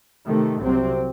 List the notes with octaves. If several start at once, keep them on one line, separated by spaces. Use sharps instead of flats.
C3 D#3 A3
C2 C3 F#3 C4